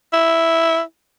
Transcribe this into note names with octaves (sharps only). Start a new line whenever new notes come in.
E4